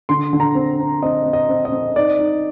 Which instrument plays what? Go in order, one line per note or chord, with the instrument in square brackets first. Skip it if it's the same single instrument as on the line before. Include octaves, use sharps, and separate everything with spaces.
[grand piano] D3 C6
D3
A#5
C4
C4
C4 D#5
C4
D#5
C4
D#5
C4
D#4 D5
D#4